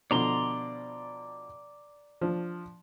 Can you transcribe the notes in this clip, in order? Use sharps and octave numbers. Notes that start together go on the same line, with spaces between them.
B2 D3 F3 D5 A#5 C6
F3 D4